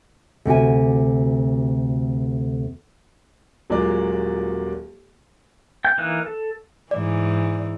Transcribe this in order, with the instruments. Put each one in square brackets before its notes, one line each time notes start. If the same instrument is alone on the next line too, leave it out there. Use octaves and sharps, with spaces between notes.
[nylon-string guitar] D2 C3 F#4 G#5
[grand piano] D#1 F#3 G#3 A#3 F4 D5
[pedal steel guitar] G5 G6
E3 A#3 D#4 F#6
A4
[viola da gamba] G#2 E3 [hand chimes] D5